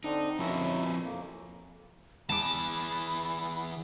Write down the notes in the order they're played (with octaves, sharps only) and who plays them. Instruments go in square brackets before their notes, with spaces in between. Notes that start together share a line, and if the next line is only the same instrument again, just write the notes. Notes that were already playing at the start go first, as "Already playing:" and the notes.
[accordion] D3 C4 D4 [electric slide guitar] D#4
[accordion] B2 C#4 E4 [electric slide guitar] F3 C4 A#4
[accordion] F2 A#3
[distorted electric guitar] E3 G#4 [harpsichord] A5 D6 [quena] B5